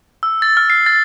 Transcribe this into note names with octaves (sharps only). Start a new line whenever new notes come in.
E6
A6
F6
C7
A6